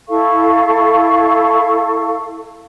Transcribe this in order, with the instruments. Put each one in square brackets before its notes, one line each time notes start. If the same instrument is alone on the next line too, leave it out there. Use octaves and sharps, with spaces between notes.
[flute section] E4 A4 F5 C#6